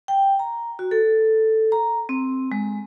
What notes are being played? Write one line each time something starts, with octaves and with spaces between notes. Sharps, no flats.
G5
A#5
F#4
A4
A#5
C4
G#3